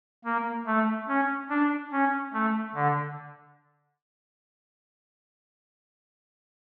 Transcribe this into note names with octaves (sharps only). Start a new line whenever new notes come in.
A#3
A3
C#4
D4
C#4
A3
D3